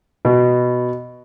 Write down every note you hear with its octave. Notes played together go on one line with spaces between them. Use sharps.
B2